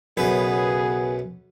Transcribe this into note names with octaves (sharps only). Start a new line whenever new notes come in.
B1 F#2 C#3 B3 G#4 B4